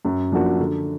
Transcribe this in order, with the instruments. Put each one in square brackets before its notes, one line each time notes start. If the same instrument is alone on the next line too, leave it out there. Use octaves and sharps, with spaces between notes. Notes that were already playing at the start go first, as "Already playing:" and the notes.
[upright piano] F#2
F3 A#3 D4 F#4
D3